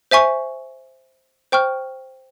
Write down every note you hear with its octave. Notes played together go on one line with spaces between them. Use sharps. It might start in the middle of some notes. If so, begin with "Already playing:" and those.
C5 E5 G#5 C#6
C5 G5 C#6 F6